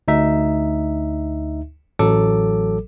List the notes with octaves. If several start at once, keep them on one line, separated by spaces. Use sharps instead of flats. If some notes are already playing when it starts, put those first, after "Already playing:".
D2 D#4 E5
A1 F#3 A4 D6